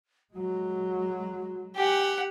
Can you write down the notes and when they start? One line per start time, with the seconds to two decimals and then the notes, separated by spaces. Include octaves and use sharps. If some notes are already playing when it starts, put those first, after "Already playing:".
0.34 F#3 G#3 F#4
1.76 G4 F#5 G#5